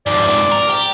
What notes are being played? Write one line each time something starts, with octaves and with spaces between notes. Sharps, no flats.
F2 G#2 D5
A#4
G4